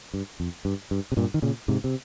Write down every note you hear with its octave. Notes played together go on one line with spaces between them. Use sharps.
G2
F2
G2
G2
C3
G2 A#2
D#3
A#2 C#3
G#2 C3
C3